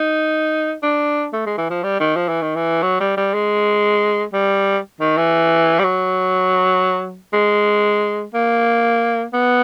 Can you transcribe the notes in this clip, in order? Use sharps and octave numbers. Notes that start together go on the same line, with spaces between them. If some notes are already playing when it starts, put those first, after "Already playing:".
Already playing: D#4
D4
A3
G#3
E3
F3
G3
D#3
F3
E3
D#3
E3
F#3
G3
G3
G#3
G3
D#3
E3
G3
F#3
G#3
A#3
B3